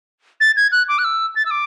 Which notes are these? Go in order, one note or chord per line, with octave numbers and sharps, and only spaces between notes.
A6
G#6
F#6
D6
F#6
E6
A6
E6
D6